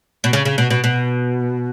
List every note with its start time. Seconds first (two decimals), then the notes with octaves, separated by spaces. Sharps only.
0.24 B2
0.33 C#3
0.45 C#3
0.58 B2
0.70 B2
0.84 B2